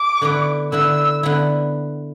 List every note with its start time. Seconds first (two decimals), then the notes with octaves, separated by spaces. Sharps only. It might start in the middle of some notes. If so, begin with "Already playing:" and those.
Already playing: D6
0.22 D3 B3 E4
0.72 D3 B3 E4 E6
1.23 D3 B3 E4